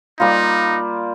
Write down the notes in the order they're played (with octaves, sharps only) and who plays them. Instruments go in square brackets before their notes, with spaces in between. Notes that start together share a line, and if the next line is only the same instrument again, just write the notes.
[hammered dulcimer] G3 A#3 F4 [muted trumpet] D#4